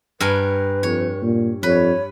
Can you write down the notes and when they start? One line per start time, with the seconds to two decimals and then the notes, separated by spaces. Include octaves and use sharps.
0.20 G2 A#4 B4 G#5
0.83 F2 C#5
1.22 A#2
1.63 F2 B4 C#5